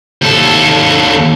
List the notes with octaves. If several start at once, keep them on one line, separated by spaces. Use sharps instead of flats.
D#2 A4